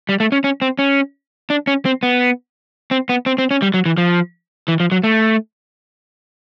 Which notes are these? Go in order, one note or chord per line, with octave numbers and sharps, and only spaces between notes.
G3
A3
C#4
C#4
C4
C#4
D4
C#4
C4
B3
C4
B3
C4
C4
C#4
G3
F#3
E3
F3
E3
F3
F#3
A3